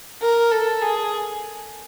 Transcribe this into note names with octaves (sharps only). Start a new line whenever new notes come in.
A#4
A4
G#4